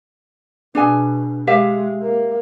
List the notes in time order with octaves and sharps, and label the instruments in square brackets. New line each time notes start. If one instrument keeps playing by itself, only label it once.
[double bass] B2 [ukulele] D4 G#4 G#5
[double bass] G#3 [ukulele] G4 E5 F5
[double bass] A#3